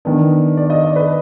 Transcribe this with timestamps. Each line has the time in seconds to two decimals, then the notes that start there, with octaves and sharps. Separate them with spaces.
0.05 D#3 B3 D4
0.57 D5
0.70 D#5
0.83 D5
0.96 B4